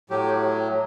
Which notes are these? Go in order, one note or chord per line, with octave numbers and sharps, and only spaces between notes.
A2 F#3 G4